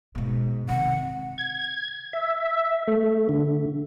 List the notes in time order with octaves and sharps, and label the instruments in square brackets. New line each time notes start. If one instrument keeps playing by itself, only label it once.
[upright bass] G#2 B2
[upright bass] C3 D#3 [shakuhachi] F#5
[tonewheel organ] G#6
E5
A3
D3